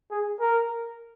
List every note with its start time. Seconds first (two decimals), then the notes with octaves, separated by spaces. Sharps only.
0.11 G#4
0.40 A#4